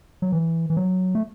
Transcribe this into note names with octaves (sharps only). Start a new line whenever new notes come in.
F#3
E3
E3
F#3
A3